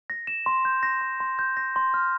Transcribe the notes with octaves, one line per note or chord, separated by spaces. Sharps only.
A#6
E7
C6
G6
A#6
C6
C6
G6
A#6
C6
F6